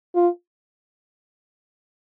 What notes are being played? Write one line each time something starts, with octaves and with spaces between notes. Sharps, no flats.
F4